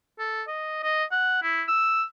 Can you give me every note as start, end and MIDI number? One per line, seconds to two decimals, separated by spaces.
0.19 0.42 69
0.48 0.82 75
0.83 1.04 75
1.11 1.41 78
1.43 1.63 64
1.68 2.03 88